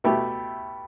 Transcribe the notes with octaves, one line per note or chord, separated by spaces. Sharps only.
B2 A3 E4 G4 G5 B5